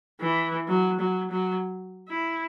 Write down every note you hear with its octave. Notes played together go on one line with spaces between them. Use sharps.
E3
F#3
F#3
F#3
E4